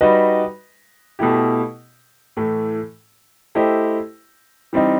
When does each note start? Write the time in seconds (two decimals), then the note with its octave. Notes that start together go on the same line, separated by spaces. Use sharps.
0.01 G3 D#4 F#4 B4 D#5
1.19 B2 A3 E4 G4
2.37 A2 E3 A3
3.55 A3 E4 G4 C5 D#5
4.73 E3 G3 C4 D#4